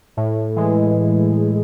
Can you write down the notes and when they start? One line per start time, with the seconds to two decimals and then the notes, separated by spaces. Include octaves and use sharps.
0.17 A2
0.56 E3 G#3